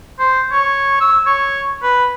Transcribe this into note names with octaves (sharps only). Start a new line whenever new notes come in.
C5
C#5
E6
C#5
B4